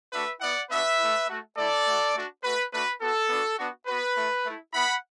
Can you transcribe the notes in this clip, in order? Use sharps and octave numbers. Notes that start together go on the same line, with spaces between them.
A3 D4 F#4 B4 E5
B3 E4 D5 F#5
B3 D4 F#4 B4 E5
A3 E4
A3 F#4
A3 E4 A4 D5
A3 F#4
A3 D4 F#4
A3 F#4 B4
A3 D4 F#4 B4
B3 F#4 A4
B3 D4 F#4
B3 D4 F#4
B3 F#4 B4
A3 E4
A3 E4
B3 E4 F#5 B5